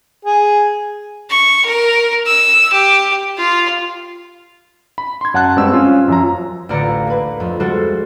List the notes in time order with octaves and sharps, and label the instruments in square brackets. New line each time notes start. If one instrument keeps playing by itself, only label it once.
[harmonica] G#4
[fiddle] C#6
A#4
E6
G4
F4
[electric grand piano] B5
C6 G#6
F#2 F#5 A5 F#6
G2 G#3 C4 E6
C#4 F4
F#2 F3 A#5
[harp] A1 D2 F4 D5 A#5 C#7
A#3 B4
F2
G3 G#3 F#4 A4 C5